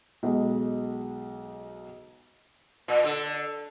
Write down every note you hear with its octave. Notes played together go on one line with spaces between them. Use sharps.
B1 G#3
A#2
D3